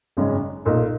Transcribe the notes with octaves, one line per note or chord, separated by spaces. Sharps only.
G#1 F#2 C#3 G#3
B1 A#2 A#3 D#4